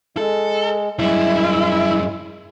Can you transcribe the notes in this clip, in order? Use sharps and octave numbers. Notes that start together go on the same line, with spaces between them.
G#3 A4
F#2 G3 G#3 E4